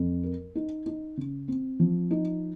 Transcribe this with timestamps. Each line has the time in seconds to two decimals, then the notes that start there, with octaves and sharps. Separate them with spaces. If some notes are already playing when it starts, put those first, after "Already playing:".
Already playing: F2
0.23 A#4
0.55 D#4
0.86 D#4
1.17 C#3
1.48 C4
1.80 F3
2.11 D#4